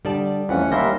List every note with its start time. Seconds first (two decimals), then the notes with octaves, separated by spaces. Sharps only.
0.05 D3 G3 D5 A5 D#6
0.49 F2 E3 A3 C#4 F#5
0.72 D#2 G3 A#4 E5 C6 A#6